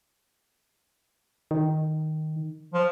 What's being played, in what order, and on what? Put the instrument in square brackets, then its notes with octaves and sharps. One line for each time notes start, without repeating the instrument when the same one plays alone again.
[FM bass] D#3
[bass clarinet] F3